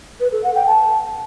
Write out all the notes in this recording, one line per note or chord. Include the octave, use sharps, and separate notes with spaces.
B4
A4
F#5
G5
A5